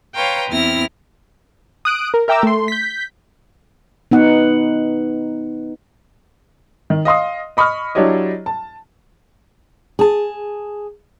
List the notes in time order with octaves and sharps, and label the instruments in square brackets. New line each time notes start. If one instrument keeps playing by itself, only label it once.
[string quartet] B4 C#5 F5 G5 A#5 C6
E2 C4 E4 F6 A#6
[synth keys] D#6 F#6 D7
A#4
A#4 E5 G5 A#5 D6 E6
A3 C6
G6 B6
[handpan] B3 D#4 F#5
[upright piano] D#3
D#5 F5 C6 D#6
D#5 B5 C#6 D#6 F6
F#3 D4 E4 G4 C#5 D#5
A5
[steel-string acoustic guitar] G#4 A5